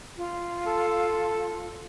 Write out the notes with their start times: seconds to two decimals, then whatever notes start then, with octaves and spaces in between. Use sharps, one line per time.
0.17 F4
0.67 A4